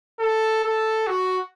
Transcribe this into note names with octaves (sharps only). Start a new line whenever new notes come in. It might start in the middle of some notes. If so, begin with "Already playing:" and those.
A4
A4
F#4